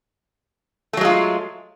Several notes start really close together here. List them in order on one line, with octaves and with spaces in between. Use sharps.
A3 F#3 G#3 F4